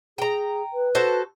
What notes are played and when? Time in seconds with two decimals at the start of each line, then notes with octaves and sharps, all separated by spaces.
0.18 G#4 G5 A#5
0.73 B4
0.95 F#4 A4 C5